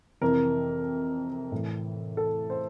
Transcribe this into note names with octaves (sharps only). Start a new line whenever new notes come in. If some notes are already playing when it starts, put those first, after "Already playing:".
F2 C3 E3 A#4
A2 E3
A4
C5